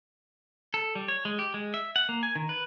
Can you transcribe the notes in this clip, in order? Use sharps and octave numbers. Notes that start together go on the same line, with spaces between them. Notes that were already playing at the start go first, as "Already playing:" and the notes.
A4
G3
C#5
G#3
G4
G#3
E5
F#5
A#3
G#5
D#3
B4